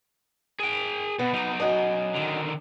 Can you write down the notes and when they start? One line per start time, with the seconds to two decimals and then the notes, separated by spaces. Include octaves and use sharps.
0.59 G#4 G5
1.19 B2 B3
1.33 F#3 D#4
1.60 F#2 D#5 G#5
2.15 D3 D#3